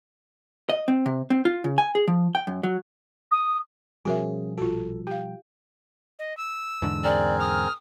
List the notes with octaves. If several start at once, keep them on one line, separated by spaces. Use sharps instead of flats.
D#5
C4
C3
C4
F4
C#3
G#5
G#4
F3
G5
F#2
F#3
D#6
B2 F3 G3 C#4 F#4 G#4 A#4 E5
A#1 F4 F#4 A4
G4 F5 G5
D#5
E6
E2 G#2 D3
C4 G#4 A#4 D5
D#6 F6